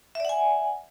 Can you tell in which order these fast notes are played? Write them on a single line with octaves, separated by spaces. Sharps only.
E5 D5 F#5 G#5